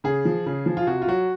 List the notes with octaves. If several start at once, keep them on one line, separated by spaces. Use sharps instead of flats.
C#3 G#4
F3
C#3
F3
F4
C3 F#4
F4
F#3 F#4